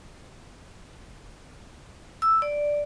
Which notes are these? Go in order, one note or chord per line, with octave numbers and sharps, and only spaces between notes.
E6
D5